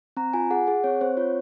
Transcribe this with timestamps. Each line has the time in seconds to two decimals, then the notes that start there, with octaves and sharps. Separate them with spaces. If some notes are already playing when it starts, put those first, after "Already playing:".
0.17 C4 A#5
0.33 F4 G#5
0.50 G#4 F#5
0.67 G#4 F#5
0.84 C4 C#5
1.01 C4 C5
1.17 F4 C#5